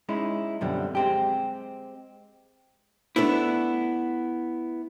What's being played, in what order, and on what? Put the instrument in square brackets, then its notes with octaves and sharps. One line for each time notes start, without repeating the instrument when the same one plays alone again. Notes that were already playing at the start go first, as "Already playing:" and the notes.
[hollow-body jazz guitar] G#3 C#4 D#4 E4
F#2 B2 D3 F3 G3 C4
G#3 C4 G4
A3 B3 D4 E4